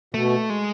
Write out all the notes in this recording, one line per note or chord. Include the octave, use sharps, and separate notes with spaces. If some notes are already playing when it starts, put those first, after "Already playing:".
B2 A3
G#3